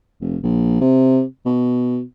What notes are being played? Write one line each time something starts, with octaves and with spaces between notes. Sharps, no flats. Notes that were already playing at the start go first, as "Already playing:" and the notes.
F1
A#1
C3
B2